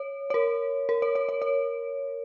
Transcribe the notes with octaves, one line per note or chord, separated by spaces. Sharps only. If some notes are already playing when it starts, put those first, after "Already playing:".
Already playing: C#5
C#5
A#4
A#4
C#5
C#5
C#5
C#5